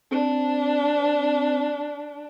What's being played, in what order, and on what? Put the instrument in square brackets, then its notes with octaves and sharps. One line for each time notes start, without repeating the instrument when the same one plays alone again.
[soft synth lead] C4 [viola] D4